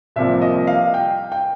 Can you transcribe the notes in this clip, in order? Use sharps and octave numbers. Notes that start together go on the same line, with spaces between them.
C2 C3 F3 A#3 E5
D#5
F5
G5
G5